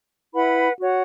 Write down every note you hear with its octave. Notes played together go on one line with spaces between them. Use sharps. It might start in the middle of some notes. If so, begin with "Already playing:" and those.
E4 B4 F#5 B5
F#4 C#5 F#5